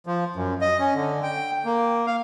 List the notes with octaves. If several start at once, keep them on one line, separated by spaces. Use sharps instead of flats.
F3
F#2
D#5
C#4
D3
G5
A#3
F5